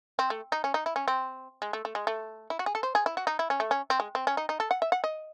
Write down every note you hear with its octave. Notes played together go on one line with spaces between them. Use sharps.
C4
A3
D#4
C#4
D#4
E4
C#4
C4
G#3
A3
A3
G#3
A3
E4
F#4
G#4
A4
C5
G#4
E4
F#4
D#4
E4
C#4
A3
C#4
C4
G#3
C4
C#4
D#4
D#4
A4
F#5
E5
F#5
D#5